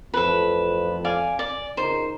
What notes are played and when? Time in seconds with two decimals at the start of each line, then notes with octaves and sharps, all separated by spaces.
0.14 A1 F2 A4 B4
1.05 D5 F5 G#5
1.39 D5
1.77 C#2 D#4 A#4 C5